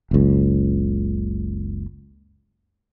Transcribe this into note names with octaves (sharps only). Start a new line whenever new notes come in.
F#1 C#2